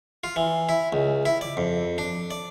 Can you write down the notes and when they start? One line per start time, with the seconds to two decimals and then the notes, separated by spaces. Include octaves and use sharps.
0.24 F4
0.36 E3
0.69 E4
0.93 C#2
1.26 E4
1.41 D5
1.57 F2
1.98 D4
2.31 D5